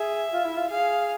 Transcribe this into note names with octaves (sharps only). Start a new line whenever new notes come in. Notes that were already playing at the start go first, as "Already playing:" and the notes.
Already playing: G#4 E5
F4
E4
F4
G#4 F5